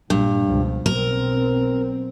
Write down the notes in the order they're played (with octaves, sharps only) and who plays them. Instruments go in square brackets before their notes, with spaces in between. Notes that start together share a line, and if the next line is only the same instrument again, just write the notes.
[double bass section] A#1 [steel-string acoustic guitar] G2
[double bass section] C#2 B2 F3
[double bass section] B1 C4 [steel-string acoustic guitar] A#4